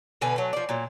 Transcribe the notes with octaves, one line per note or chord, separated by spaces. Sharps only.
B2 D3 B4 G#5
F#3 A3
F3 D5
A#2 F#3